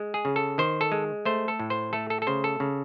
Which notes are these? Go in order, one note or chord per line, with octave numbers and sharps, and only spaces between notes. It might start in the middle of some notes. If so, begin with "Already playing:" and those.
Already playing: G#3
G#4
C#3
A4
D#3 C5
A4
G#3
A3 C5
A4
A2
C5
A3 A4
A4
A4
C#3 C5
A4
C#3